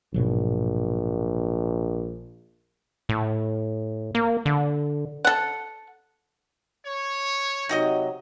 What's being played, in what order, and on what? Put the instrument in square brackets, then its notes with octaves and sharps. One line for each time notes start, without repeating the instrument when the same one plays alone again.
[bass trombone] A#1 [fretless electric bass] G#2 B2 F#3
[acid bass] A2
A#3
D3
[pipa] A4 F#5
[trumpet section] C#5
[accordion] C3 F#3 [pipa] D#4 F#4 D#5